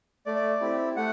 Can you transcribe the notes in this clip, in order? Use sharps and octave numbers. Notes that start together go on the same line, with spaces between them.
A3 D5
C4 E4 G4
A3 F#5